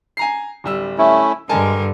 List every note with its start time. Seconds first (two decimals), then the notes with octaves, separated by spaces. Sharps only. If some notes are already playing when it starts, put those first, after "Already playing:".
0.17 G#5 A#5 C7
0.64 D1 G3 E6
0.98 A3 C#4 E4
1.49 G2 D3 G#3 A#4 G#5 A5